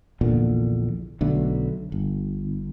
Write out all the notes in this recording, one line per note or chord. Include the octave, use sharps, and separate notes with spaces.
A#1 E2 A#2 D3
B1 D3 A3
G1